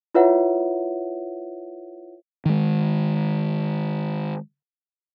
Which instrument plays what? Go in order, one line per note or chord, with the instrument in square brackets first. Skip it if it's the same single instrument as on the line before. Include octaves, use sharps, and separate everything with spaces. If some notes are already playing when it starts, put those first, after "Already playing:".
[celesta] E4 F4 B4 C#5 E5 F#5
[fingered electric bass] D#3 G#3